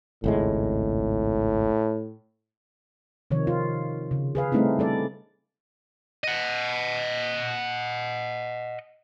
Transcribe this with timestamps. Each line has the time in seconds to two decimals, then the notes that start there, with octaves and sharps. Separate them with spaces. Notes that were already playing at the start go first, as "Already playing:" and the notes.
0.24 G#1 C#2 A2 G#3
3.31 C3 D#3 F3 C#5
3.47 F4
4.11 C#3
4.35 G#4 B4 F5
4.52 G3 A3 C4 C#4 D#4 E4
4.79 G3 A4 D5
6.24 D#5 F#5